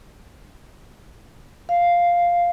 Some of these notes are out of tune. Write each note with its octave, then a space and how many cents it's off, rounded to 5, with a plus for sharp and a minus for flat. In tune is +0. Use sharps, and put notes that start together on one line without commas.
F5 +0